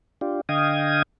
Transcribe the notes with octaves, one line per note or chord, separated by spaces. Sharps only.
D4 F4 G4
D3 D#5 F5 G5 D#6 G#6